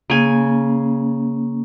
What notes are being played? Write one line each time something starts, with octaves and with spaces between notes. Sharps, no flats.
C#3 A#3 C#4 G#5